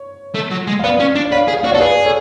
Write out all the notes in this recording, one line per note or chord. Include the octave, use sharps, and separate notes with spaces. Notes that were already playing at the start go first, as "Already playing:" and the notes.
Already playing: C#5
A3
F#3
G#3
F5
B3 B4 D5
C#4
D4
D5
B4 C#5 F5
G#4
F5
F#4 D5
C#5 F5
A4
G#4 B4 D5
A4 C#5